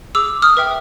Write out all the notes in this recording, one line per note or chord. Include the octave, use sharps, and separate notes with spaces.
G#4 D6 E6
D#6 F6
B4 E5 G5